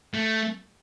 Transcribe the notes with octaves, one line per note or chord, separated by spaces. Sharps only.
A3